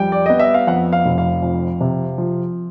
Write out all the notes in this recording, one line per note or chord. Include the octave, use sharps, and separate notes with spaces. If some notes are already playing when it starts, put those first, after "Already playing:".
Already playing: F2 G3 G5
D5
B3 D#5
E5
F5
F2 F#5
F5
F1
F5
F2
C3
F3